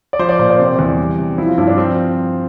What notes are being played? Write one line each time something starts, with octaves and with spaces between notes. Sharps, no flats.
D5
F3 C5
D5
A#2 C5
D5
C5
C3
D5
E2
G3
C3
F3 E4
F4
G2 E4
D4
F3 C4